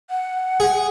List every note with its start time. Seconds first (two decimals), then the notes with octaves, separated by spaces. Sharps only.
0.10 F#5
0.60 G#4